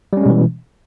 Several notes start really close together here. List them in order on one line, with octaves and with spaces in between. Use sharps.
G3 C#4 G#3 B2 E3